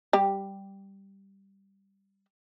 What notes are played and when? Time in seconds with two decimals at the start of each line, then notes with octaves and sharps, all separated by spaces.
0.13 G3 G4